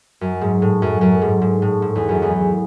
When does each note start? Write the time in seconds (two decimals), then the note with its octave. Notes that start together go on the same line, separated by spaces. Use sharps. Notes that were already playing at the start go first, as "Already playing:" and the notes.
0.21 F#2
0.41 G#2
0.62 A2
0.82 F#2
1.01 F#2
1.22 G#2
1.42 G#2
1.62 A2
1.82 G#2
1.96 E2
2.09 F#2
2.22 E2